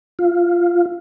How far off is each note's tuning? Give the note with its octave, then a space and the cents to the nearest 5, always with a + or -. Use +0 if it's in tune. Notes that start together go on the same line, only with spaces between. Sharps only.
F4 -10